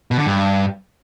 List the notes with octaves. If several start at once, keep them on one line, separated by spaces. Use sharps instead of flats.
B2
D3
G2